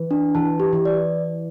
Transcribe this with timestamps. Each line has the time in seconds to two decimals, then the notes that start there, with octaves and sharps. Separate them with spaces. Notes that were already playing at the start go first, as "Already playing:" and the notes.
Already playing: E3
0.11 D4
0.35 E3 A5
0.60 G4
0.73 E3
0.85 D5